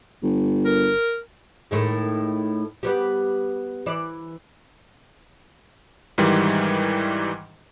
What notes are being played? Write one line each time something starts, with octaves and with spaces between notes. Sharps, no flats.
G1
A#4
A2 D#3 G#3
G3 B3 G4
E3 D5
G#2 D#3 E3 G3